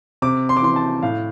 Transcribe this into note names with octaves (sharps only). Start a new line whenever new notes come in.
C3 D6
C6
D6
E3 C6
A5
A2 F5